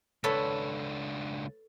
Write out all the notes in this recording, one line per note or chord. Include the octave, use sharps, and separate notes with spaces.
C#2 D4 A4 B4 C#5